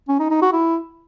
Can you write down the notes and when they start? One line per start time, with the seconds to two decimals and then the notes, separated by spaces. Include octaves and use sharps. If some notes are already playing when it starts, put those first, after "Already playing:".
0.08 C#4
0.19 D#4
0.31 D#4
0.42 F#4
0.53 E4